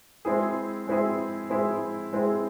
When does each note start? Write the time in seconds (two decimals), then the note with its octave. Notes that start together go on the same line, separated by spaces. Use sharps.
0.25 G#3 C4 E4 G#4
0.87 G#3 C4 E4 G#4
1.50 G#3 C4 E4 G#4
2.13 G#3 C4 E4 G#4